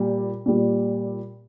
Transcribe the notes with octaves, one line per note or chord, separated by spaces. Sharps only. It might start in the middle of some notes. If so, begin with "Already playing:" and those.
Already playing: A#2 G3
A#2 G3